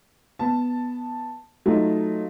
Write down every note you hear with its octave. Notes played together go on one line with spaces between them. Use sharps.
B3 A5
F#3 A3 D#4 F4